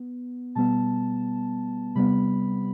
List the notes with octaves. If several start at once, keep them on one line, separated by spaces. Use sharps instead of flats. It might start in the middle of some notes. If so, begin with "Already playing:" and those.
Already playing: B3
B2 G3 B3 A5
C3 G3 B3 B5